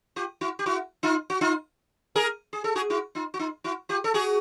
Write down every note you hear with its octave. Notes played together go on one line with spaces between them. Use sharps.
F4 G4
E4 F#4
G4
E4 F#4
D#4 F4
F#4
D#4 F4
G#4 A#4
G#4
A4
F#4 G#4
E4 F#4
D#4 F4
F#4
D#4 F4
E4 F#4
F4 G4
A4
F#4 G#4